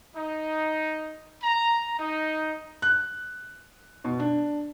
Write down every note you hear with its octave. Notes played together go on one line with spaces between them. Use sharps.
D#4
A#5
D#4
F#6
B2
D4